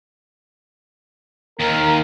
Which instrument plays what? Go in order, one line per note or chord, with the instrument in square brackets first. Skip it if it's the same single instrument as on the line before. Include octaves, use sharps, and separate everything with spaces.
[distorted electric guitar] D#2 D#3 [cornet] A#4